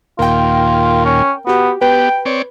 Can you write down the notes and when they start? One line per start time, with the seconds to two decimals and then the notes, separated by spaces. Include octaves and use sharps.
0.19 D#2 A#2 F4 A#4 G5
1.05 C#4
1.47 B3 F#4 G4
1.81 B3 G4 B4 G5
2.25 C4 C#5 D5